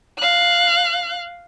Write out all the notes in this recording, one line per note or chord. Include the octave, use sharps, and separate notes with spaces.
F5 F#6